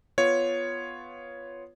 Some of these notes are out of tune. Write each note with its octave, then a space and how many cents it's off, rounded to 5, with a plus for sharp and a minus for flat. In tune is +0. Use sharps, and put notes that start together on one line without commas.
B3 +0 F4 +0 C#5 +0